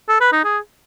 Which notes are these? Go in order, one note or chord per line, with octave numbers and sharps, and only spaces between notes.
A4
B4
D#4
G#4